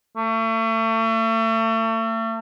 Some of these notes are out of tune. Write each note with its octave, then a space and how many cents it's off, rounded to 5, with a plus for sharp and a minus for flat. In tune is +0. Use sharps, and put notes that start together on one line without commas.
A3 +35